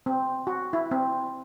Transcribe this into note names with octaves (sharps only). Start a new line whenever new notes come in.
C4
F#4
E4
C4